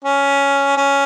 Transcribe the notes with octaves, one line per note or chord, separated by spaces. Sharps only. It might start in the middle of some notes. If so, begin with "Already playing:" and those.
C#4
C#4